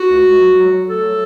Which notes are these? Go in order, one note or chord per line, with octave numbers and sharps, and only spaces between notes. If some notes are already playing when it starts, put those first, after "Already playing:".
Already playing: F#4
C#2
C#2
F#3
F#3
F#3
A3 A4
F#3